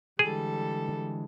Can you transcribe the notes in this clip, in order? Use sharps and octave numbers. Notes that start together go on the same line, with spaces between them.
D3 E3 G3 G#3 G#4 A4